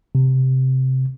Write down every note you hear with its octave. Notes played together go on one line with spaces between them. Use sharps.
C3